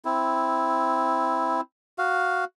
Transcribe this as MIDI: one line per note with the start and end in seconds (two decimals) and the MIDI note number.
0.05 1.61 60
0.05 1.61 64
1.98 2.45 66
1.98 2.45 77